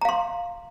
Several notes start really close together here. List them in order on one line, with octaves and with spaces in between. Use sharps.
A#5 F5 C6